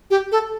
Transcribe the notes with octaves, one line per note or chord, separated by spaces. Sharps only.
G4
A4